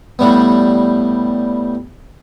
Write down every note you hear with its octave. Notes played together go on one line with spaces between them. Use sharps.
A2 G3 B3